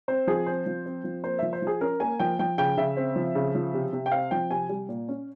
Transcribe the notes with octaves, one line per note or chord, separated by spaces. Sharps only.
C4 C5
F3 G#4
C4 C5
F3
C4
F3
A#3 C5
F3 E5
C5
F3 G#4
C#4 A#4
A#3 G#5
F3 G5
F3 G5
C#3 G5
C#3 E5
C4
F3
C#3
F3
C3
C3
G5
C4 F5
F3 G5
C3 G#5
G3
A#2
C#4